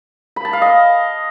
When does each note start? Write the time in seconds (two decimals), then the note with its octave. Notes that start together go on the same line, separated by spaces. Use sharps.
0.36 B5
0.45 A5
0.53 F5
0.62 D#5